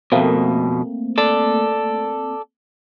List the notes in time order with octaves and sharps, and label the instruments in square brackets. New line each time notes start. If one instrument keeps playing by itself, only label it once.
[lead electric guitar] F2 B2 [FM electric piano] A3 A#3 C4
[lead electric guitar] A4 D5